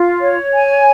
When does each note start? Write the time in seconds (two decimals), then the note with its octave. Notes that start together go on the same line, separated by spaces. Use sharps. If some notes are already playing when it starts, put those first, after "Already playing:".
Already playing: F4
0.21 C#5
0.53 G#5